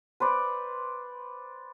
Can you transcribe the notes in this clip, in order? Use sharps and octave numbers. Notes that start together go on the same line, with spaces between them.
B4 C5 D5